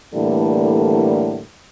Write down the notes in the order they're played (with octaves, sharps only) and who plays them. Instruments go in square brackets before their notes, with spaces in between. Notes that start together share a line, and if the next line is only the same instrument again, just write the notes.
[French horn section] A2 D3 E3 G3 A3 A#3